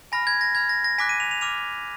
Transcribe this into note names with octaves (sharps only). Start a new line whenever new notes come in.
G#5 B5 F6 A#6
G#6
A#6
B5 F6 G#6
A#6
A#6
G#5 D6 F#6 B6
D#7
F7
F7
G#5 D6 F6 F7